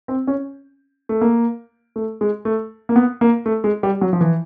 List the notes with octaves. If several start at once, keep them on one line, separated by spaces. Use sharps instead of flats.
C4
C#4
A3
A#3
A3
G#3
A3
A#3
B3
A#3
A3
G#3
G3
F#3
F3
E3